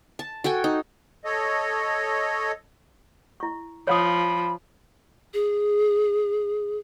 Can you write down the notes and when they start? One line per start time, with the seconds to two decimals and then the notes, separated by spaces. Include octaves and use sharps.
0.19 A5
0.44 F#4 A4 G5 G#5
0.64 D#4
1.24 A4 C#5 D#5
3.40 E4 C#6
3.87 F3 C#5 F5 B5 D#6
5.34 G#4